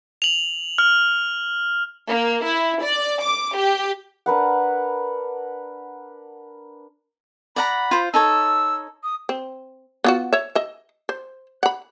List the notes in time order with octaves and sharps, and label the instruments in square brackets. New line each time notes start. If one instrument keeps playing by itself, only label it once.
[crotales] F7 F#7
F6
[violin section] A#3
E4
D5
D6
G4
[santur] D4 A#4 B4 F#5
[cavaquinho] D5 F#5 A#5 [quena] B5
[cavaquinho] F4 C5
[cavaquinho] D#4 A4 C#5 [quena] E6
[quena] D#6
[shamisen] C4
B3 F4 F#4
C#5 E5
D#5 E5
C5
F#5 B5